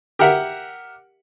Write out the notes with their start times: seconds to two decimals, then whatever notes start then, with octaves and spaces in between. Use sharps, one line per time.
0.19 G4 A#4 E5 F#5